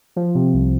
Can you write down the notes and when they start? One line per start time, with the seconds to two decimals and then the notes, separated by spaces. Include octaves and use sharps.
0.16 F3
0.35 C3
0.54 C2